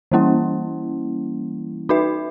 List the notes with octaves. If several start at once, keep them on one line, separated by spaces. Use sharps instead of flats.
E3 G3 A#3 C#4 E4
D#4 F#4 B4 E5